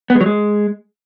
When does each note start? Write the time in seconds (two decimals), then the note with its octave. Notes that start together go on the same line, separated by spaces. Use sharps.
0.10 B3
0.15 G#3
0.21 F#3
0.26 G#3